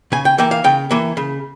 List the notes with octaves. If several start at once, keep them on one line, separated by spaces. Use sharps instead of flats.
C#3 G#5
G5
E3 A#3 G5
F5
C#3 G5
E3 A#3
C#3